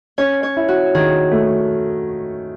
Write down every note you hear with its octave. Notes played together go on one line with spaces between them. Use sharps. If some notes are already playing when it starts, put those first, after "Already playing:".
C#4 C#5
C#5
E4
F#4
D#3 G#4
A3